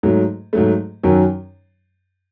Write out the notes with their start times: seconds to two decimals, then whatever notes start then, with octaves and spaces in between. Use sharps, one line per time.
0.03 G#2 F#3 A3
0.53 G#2 F#3 A3
1.04 F#2 D#3 F#3